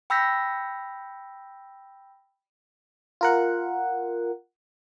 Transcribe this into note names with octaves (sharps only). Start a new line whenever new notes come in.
G5 B5 E6 G6 A#6 B6
F4 A#4 F#5